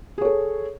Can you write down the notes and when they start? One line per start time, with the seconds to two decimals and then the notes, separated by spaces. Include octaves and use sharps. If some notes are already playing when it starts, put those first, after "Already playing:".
0.18 G#4
0.21 C#5
0.25 A4